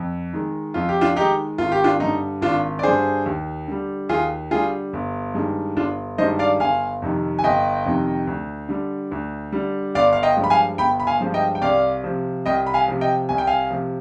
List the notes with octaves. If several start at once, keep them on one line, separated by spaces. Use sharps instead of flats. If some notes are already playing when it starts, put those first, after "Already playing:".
Already playing: F2
D#3 G#3
F2 F4
G4
D4 F4
D#3 G#3 D#4 G4
G#1 F4
G4
D4 F4
G2 D3 D#4
G#1 D4 F4
D5
G2 D3 G#4 C5
D#2
D3 G3
D#2 F4 G#4
D3 G3 F4 G#4
G1
G2 D#3 G#3
G1 D4 F4
G2 D#3 G#3 C5 D#5
D5 F5
G1 F5 G#5
F2 C3 D#3
G#5
G1 D#5 G5
F2 C3 D#3
D2
D3 G3
D2
D3 G3
G1 D5 F5
F5
D#5 G5
G2 F3 G#3
B5
F5 G#5
G1 G5 B5
B5
F5 G#5
G2 F3 G#3
D#5 G5
G5
C2 D5 F5
C3 F3
C2 D#5 G5
B5
F5 G#5
C3 F3
D#5 G5
C2 G#5
G5
F5 G#5
C3 F3